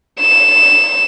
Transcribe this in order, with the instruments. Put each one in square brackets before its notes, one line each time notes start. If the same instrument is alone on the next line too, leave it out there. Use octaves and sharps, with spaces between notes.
[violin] E7